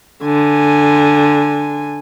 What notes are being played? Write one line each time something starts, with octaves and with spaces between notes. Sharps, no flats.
D3 G#5